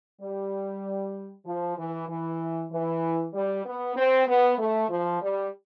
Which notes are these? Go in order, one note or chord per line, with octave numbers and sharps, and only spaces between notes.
G3
F3
E3
E3
E3
G3
B3
C4
B3
A3
F3
G3